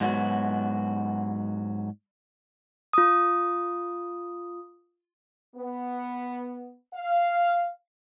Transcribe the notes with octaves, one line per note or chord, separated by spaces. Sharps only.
G#2 F#3 B3 F#4
F4 D#6
B3
F5